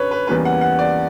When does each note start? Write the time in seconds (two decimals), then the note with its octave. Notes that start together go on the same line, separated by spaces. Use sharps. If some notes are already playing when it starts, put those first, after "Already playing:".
Already playing: F#2 D3 B4 C#5
0.11 B4
0.27 E2 C#3 E3 G3 A#3 B4
0.45 F#5
0.61 F#5
0.79 D5